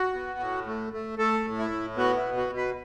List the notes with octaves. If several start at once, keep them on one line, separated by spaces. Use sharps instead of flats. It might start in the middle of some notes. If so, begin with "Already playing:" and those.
Already playing: F#4
B3
A2
A3
A3
A3 A4
A2
E4
A2
B3 F#4
E4
B2
F#4
B2
B4